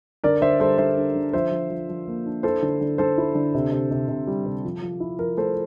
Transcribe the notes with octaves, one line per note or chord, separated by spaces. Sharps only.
D3 A#4 D5
D3 C5 E5
G3 A4 C5
D3 C5 E5
D4
D3
F3 C5 E5
F3
F3
F3
A#3
D4
E4 A4 C5
D3
D3
D3 A4 C5
E4
D3
C3
C3
C3
C3
G3
C3
F3
F3
E4
F3 A#4
A3 A4 C5